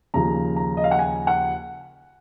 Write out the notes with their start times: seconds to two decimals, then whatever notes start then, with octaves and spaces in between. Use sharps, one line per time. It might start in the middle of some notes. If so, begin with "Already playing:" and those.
0.14 D#2 C#3 F3 A#5
0.56 A#5
0.77 D#5
0.84 F5
0.91 F#5
0.99 G#5
1.27 F#5